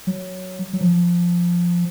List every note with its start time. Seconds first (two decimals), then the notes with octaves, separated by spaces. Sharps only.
0.07 F#3
0.73 F#3
0.81 F3